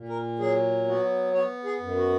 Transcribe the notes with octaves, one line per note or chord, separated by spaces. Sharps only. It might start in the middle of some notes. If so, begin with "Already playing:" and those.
Already playing: A#2
A#4
F#3 G#4
B3 F#4
B3 C#5
G#4
F#2
F#4